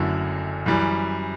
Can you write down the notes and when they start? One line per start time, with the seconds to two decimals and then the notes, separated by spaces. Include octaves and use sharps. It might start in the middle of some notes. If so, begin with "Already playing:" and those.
Already playing: F#1 F#2 D3 F#3 A3 E4
0.66 F#2 E3 G3